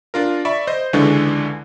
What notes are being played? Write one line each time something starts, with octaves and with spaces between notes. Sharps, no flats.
D4 F4 A#4
D5 E5 B5 C#6
C5 D#5 G6
C#2 D3 E3 G#3 D4 C#6